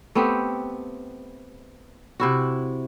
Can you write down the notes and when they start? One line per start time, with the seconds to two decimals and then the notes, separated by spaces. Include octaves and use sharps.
0.15 A3 B3 C4 G4
2.20 C3 E4 F#4